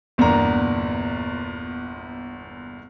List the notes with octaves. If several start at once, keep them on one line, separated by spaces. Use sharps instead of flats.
G1 E2 A#2 D4 A#5